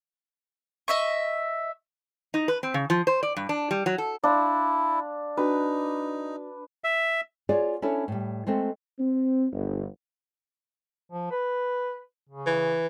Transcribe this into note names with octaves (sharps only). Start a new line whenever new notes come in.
D#5 E5 C#6
D#4
B4
C4
C#3
F3
C5
D5
G2
D4
G3
F#3
A4
D4 E4 F5 C6
D4 D#4 F#4 B4
E5
F4 F#4 G#4 C#5 D5
C#4 D4 E4 A4 C#5
A2 G3
G#3 A3 C4 A4
C4
G1
F3
B4
C#3
E3